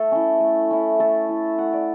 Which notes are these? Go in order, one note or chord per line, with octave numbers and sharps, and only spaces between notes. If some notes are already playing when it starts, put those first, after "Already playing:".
Already playing: A3 A4
C#4 E4
A3
C#4 E4
A3 A4
E4
A3 F#5
D5